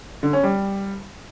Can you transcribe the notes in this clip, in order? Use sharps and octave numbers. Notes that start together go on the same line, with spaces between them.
D3
C#4
G3